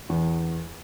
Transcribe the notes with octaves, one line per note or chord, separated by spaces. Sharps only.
E2